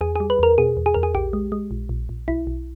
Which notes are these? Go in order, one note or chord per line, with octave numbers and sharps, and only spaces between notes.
E2 G#4
G3 G#4
B4
E2 A#4
B2 G#4
E2
G#4
E2 A#4
G#4
A#1 G4
G#3
G#3
A#1
A#1
A#1
B1 E4
B1